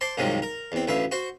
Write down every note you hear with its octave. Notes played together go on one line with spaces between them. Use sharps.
C5 D5 A5 C6
C2 G#2 C3 D#3 F3 F#3
A#4
E2 C4
A1 D2 B4 E5 F5
F#4 C5